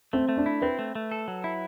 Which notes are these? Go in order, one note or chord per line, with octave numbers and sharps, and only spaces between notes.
A3 C4
A3
D4
E4
C4 B4
A3
A3
A4
F#3
E4